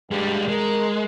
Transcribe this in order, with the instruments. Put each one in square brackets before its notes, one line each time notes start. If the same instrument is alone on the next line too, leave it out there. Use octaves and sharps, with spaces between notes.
[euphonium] G2 [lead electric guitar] G3 G#3
[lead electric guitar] G#3 [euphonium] A#4